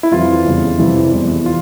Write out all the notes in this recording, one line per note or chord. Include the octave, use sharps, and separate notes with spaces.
E4
F2 E3 G3 F4
E2 C#3 G3
F2 C3 E3 G3 E4
E2 E3 G3
F4